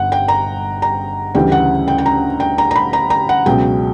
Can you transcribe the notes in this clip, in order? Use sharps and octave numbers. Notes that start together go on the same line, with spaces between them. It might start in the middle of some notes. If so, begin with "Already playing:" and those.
Already playing: G1 F#5
G5
A#5
A#5
D2 C#3 E3 G3 G5
F#5
G5
G5
A#5
G5
A#5
A#5
B5
A#5
A#5
F#5
C#2 B2 F#3 G5